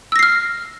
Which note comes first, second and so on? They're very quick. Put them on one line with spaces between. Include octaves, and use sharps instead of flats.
E6 A#6 C7 F6